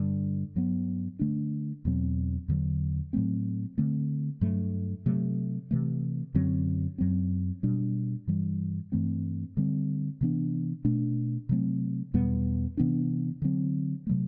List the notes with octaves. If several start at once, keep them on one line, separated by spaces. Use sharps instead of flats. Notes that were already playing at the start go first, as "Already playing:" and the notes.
Already playing: G2 D3 G3
G2 F#3 B3
D3 A3 D4
E2 B2 F#3 C4
E2 D3 F#3
A2 F#3 A3 C4
D3 A3 C4
G2 F#3 A3
C3 F#3 A3
C3 E3 A3
F#2 D3 F#3 C4
F#2 F#3 C4
B2 G3 D4
G2 E3 G3
G2 E3 A3 C4
D3 G3 C4
C3 E3 B3 D4
B2 A3 D4
C3 F#3 A3 C4
E2 B2 G3 B3
C3 E3 B3 D4
D3 F#3 C4
C3 F#3 A3